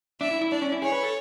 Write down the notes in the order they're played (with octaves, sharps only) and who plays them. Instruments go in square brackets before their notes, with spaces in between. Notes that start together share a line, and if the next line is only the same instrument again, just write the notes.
[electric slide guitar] D4 [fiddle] E5
[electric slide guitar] E4
E4
[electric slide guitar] D4 [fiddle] D5
[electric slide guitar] C#4
E4
[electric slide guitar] G#4 [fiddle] C#5
[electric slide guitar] B4
A4